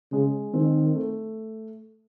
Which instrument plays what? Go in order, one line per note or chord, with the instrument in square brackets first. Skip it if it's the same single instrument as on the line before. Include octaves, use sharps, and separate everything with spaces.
[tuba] C#3 [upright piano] G#3
[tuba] D#3 [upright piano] C4
[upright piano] A3